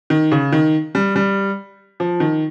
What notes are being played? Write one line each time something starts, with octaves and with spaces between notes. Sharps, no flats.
D#3
C#3
D#3
G3
G3
F3
D#3